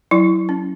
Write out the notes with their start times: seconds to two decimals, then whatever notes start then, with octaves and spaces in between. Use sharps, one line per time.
0.11 F#3 E4
0.49 C#4